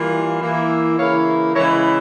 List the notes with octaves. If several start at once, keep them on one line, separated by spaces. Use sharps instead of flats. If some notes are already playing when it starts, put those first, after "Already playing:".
Already playing: E3 G3 A#3 F4
E3 A#3 E4
C#3 E3 A#3 E4 C#5 F5
C#3 E3 G#3 E4 A#4 C#5